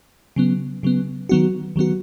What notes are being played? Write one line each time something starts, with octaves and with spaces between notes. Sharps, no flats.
C#3 F#3 B3
C#3 F#3 B3
D#3 F#3 B3 F#4
D#3 F#3 B3 F#4